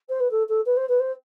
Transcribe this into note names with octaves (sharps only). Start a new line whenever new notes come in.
C5
B4
A4
A4
B4
C5
B4
C5